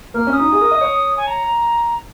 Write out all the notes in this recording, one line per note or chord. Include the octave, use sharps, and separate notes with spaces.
A#3 F6
C#4
D#6
D#4
G#4
A#4
D#5
C#5
G#5
A#5